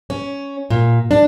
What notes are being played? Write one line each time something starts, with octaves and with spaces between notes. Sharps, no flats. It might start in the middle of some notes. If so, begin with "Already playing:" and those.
C#4
A#2
D4